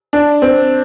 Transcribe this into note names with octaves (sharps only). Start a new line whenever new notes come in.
D4
C4